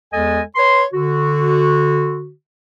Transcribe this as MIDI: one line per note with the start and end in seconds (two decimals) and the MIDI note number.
0.13 0.40 40
0.13 0.40 56
0.13 0.40 69
0.13 0.40 75
0.13 0.40 80
0.55 0.83 71
0.55 0.83 73
0.55 0.83 84
0.93 2.30 50
0.93 2.30 66